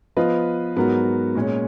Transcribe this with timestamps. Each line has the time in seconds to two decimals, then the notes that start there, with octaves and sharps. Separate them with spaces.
0.17 F3 B3 F4 B4 D#5
0.76 G#2 F#3 B3 F#4 A#4
1.35 A#2 G#3 C#4